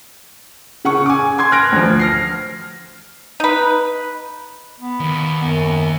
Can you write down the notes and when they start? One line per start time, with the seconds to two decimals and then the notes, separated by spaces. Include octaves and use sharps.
0.85 C#3 F#5 C#6
1.06 G#5 D6
1.38 G#5 C6 G#6
1.52 F6 F#6 G#6 A#6 D7
1.72 D2 F3
1.99 F6 A#6 C7
3.40 D#4 B4
4.80 B3
5.00 D#2
5.44 F#2